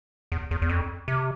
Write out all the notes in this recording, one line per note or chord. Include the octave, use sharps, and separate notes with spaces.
E2
E2
E2
F2
C3